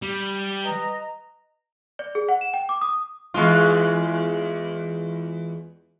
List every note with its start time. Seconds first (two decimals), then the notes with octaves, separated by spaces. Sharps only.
0.02 G3
0.64 B4 D#5 A#5
1.99 D5
2.15 G#4
2.29 F#5
2.41 E7
2.54 G5
2.69 D6
2.81 D#6
3.34 E2 G#3 F4